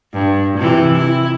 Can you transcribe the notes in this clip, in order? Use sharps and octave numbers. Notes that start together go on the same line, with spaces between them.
G2
C3 E3
E4